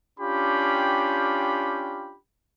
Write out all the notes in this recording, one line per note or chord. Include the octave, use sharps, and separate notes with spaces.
C#4 D4 F4 G4 G5 B5